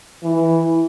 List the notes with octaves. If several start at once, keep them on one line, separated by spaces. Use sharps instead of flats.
E3